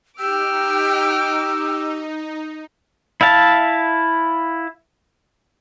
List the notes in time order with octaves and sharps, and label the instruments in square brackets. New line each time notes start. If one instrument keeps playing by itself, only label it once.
[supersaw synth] D#4 [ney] G4 [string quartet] G5 D6 F6 [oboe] E6
[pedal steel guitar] E4 E5 F5 A5